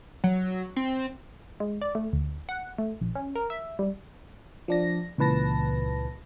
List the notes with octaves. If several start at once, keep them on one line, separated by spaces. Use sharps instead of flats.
F#3
C4
G#3
D5
A3
D2
F#5
A3
A#1
C#4
A#4
E5
G3
F3 D4 A#6
C#2 A#2 E3 B4 A5 A#6